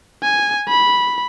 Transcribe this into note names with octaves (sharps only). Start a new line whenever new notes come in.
G#5
B5